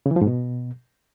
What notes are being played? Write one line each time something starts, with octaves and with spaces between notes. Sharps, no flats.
C#3
E3
F3
G#2
B2